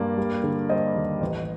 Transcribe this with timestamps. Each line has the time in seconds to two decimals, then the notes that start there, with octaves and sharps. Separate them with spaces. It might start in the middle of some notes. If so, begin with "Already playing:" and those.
Already playing: G2 A#3 A#4 D5
0.18 G3
0.44 D3
0.69 G3 C5 D#5
0.95 D#2
1.21 A1